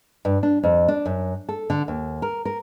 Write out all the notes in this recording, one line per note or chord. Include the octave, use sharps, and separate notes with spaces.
G2
D4
F2
D4
F#2
A4
D3
D#2
A#4
A#4